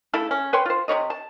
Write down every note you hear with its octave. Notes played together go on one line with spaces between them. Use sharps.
C#3 A3 E4 A4
C#4
B4 C#5 G5 C6
F4 C5
C3 D#4 C#5 D#5
A5